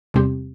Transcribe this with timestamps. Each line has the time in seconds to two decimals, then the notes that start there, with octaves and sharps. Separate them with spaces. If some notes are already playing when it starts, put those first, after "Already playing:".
0.14 E2 C3 G3 C4 G4